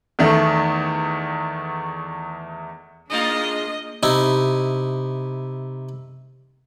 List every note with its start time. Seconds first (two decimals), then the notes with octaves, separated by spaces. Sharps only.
0.19 E2 D#3 A3
3.10 G#3 A#3 D4 D#4 F4 D#5
4.03 C3 D#4 E4